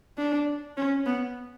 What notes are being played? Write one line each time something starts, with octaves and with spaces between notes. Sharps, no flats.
D4
C#4
B3